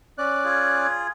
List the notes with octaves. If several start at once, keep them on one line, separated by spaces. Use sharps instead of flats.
C#4 D5 F#6
F4 G#4 G#6